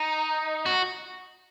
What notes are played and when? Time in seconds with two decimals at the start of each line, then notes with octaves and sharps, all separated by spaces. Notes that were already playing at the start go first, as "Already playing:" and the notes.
Already playing: D#4
0.66 F#4